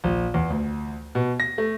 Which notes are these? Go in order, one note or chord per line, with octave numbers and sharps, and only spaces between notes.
A#1
E2
D2
B2
A#6
A3